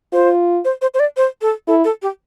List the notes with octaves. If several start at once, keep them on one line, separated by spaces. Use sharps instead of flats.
F4 C5
C5
C5
C5
D5
C5
A4
E4 A4
A4
G4